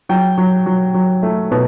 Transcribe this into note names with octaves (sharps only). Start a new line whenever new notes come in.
F#3 G5
F#3
F#3
F#3
A3
B2